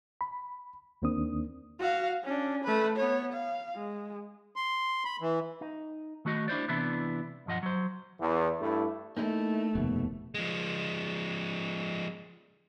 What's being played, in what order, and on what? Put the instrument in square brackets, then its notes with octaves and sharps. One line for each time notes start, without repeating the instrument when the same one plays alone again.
[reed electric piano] B5
D#2 D#3 A#3 C4 D4 D#6
[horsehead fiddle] F#4 F5
C#4 D4
A3 B4
B3 C#5
F5
G#3
[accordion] C6
B5
E3
[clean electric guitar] D#4
D#3 A3 F#4 D#5
D4 E4 C5 D5
C3 E3 B3 D4 E4
B1 G2 F3 D#5 F#5
F#3 C5
[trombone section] E2
G2 A3 E4
[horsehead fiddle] A3 [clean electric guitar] A#3 D#4 E4
[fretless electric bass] F1 D#2 [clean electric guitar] B2
[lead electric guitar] F3 G#3